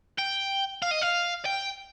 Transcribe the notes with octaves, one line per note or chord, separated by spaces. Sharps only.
G5
F5
D#5
F5
G5